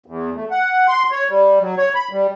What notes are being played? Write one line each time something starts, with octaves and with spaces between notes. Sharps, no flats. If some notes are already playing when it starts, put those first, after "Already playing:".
E2
A3
F#5
C6
C#5
G3
F#3
C#5
B5
G3